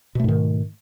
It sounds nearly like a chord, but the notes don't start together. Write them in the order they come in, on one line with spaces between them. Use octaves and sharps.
B2 A3 G#2 D#3